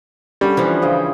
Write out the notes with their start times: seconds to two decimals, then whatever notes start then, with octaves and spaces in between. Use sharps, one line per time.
0.41 D3 G3 C#4
0.57 E3 F3
0.82 C#3 G#4 G5